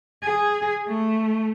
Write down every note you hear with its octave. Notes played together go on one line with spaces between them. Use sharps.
G#4
A3